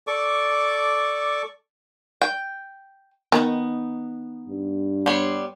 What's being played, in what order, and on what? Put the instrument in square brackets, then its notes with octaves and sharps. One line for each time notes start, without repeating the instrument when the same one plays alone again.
[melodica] A4 D5 C#6 D6
[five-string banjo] G5
[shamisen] D#3 [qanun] B3 D#4
[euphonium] G2
[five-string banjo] G3 B3 C#5 [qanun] C6